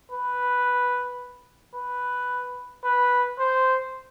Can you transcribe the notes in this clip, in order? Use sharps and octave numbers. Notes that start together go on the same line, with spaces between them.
B4
B4
B4
C5